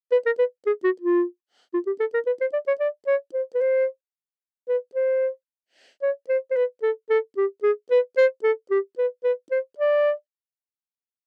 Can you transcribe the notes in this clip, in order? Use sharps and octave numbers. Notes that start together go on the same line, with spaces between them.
B4
A#4
B4
G#4
F#4
F4
F4
G4
A4
A#4
B4
C5
D5
C#5
D5
C#5
C5
B4
C5
B4
C5
C#5
C5
C5
B4
A4
A4
G4
G#4
B4
C5
A4
G4
B4
B4
C5
D5